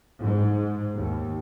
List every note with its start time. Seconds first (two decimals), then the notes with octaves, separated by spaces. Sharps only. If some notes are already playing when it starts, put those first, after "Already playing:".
0.21 G#2
0.97 D#2